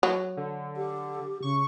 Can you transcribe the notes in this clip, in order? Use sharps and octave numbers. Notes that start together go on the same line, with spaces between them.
F#3
D3
G4
C#3 C#6